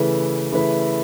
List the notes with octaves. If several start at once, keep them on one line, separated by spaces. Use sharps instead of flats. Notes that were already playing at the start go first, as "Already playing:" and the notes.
Already playing: C#3 E3 A3 E4 B4
C#3 E3 A3 E4 B4